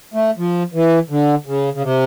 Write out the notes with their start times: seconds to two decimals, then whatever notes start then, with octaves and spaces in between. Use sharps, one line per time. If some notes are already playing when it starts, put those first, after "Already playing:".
0.14 A3
0.38 F3
0.74 E3
1.10 D3
1.46 C#3
1.73 C#3
1.82 C3